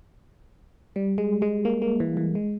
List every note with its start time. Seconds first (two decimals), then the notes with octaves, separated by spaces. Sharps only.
0.96 G3
1.18 G#3
1.42 G#3
1.65 A#3
1.82 A#3
2.00 E3
2.17 E3
2.35 G#3